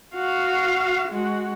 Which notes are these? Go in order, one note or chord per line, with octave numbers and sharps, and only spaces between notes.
F#4 F5
G#3 F#4